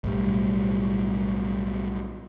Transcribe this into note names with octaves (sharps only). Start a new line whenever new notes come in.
B1 A2 G3